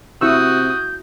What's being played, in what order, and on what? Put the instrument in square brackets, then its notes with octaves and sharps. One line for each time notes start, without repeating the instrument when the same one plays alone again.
[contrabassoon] C3 [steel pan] E4 C#6 E6 [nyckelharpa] F#4 D#6 [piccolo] G6